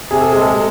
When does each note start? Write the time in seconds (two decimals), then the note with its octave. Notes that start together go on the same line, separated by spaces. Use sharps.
0.11 C3 G#4
0.21 A4
0.32 G#3 G#4
0.41 A4
0.52 G#4